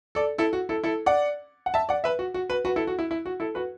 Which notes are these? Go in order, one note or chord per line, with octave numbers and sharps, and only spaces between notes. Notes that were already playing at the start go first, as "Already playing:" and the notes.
A4 D5
E4 A4
F#4
E4 A4
E4 A4
D5 F#5
F#5
E5 A5
D5 F#5
B4 E5
F#4
F#4
F#4 B4
F#4 B4
E4 A4
F#4
E4
E4
F#4
E4 A4
F#4 B4